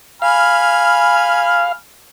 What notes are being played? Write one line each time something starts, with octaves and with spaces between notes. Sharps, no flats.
F5 G#5 B5 F6